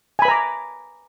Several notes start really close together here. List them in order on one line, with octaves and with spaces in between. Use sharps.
G#5 B5 B4 A#5 D6